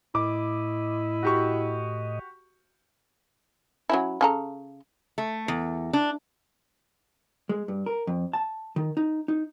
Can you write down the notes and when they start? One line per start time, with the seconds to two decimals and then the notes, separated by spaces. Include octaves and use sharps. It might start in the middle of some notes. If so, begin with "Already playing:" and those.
0.15 A2 E4 D#5 D6
1.23 F#4 G4 C#6
3.90 F#3 C#4 E4
4.21 C#3 A4 A#5
5.18 A3
5.48 E2
5.93 D4
7.49 G#3
7.68 G2
7.86 A#4
8.07 F2
8.33 A5
8.76 D#3
8.97 D#4
9.28 D#4